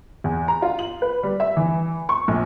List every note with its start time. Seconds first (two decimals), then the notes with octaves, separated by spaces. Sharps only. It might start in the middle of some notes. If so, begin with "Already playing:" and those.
0.24 E2
0.48 A#5
0.62 F4
0.79 F#7
1.02 B4
1.23 G3
1.40 E5
1.57 E3
2.09 C#6
2.28 A#1